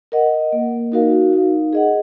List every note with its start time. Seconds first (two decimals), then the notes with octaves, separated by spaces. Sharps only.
0.12 A#4 D#5 F#5
0.52 A#3
0.92 D#4 F#4 A#4 F5
1.33 D#4
1.73 G#4 D#5 F#5